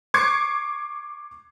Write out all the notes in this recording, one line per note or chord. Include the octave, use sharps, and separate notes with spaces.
C#6 D6 G#6 C7 C#7